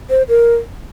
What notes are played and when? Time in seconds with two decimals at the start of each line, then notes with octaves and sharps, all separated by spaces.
0.10 C5
0.29 A#4